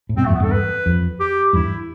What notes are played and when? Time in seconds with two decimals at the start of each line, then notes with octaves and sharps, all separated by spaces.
0.09 A2
0.17 G2 B2 C4
0.26 A3
0.29 F2 A2
0.34 B3
0.40 E2 G2 A4
0.52 B4
0.86 F2
1.20 G4
1.53 E2 G2 E4